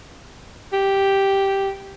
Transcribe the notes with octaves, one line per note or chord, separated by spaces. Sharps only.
G4